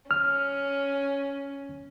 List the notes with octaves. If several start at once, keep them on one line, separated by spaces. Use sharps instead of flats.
C#4 F6